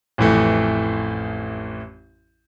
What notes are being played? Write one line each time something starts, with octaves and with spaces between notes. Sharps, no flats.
A1 F2 E3 A3